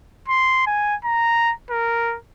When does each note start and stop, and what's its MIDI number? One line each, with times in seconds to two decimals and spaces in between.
0.28 0.67 84
0.67 0.95 80
1.04 1.52 82
1.70 2.17 70